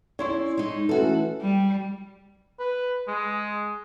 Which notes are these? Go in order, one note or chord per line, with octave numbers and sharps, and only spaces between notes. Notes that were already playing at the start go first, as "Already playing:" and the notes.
C#4 E4 C#5 D5 C6
G#3 D#4
E3 A3 C#4 F#4 A4
G3
B4
G#3